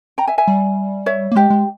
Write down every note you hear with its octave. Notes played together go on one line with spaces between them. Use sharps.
G5 A#5
E5 G#5
E5 G#5
G3
C#5 E5
A#3
G#3 G4
G#3